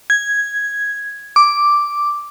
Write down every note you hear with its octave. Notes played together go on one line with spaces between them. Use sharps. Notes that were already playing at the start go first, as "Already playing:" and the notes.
G#6
D6